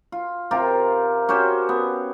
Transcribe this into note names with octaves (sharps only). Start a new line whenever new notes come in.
F4
C3 F4 G4 A#4
C#4 F#4 G4 C5
B3